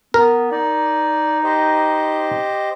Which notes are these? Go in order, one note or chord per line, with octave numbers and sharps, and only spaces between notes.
B3 A#4
D#4 D5
G4 C5 D#5